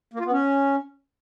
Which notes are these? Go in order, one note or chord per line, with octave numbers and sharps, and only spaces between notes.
A#3
F4
B3
C#4